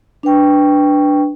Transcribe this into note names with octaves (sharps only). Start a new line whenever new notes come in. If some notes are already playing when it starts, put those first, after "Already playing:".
D4 B4 G5 C#6